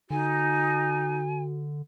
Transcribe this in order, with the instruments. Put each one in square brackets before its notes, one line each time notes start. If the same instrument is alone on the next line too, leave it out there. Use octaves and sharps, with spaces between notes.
[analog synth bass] D3 [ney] D#4 [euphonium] F#4 [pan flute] G#5